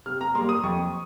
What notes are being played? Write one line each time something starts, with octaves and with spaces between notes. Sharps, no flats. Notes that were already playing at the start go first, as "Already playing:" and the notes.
C3 F6
A#5
G3 A#3 C6
D#6
F2 C#6